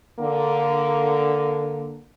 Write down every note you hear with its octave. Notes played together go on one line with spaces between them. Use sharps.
D3 A#3